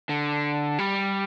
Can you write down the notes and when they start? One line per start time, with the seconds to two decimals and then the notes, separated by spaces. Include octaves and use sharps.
0.09 D3
0.79 G3